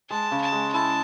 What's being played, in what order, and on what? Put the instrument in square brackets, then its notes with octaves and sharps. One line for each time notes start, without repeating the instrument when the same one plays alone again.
[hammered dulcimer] G#3 [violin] A5
[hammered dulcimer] C#3
[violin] A5
[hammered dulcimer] G#3
[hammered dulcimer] E4 [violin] A5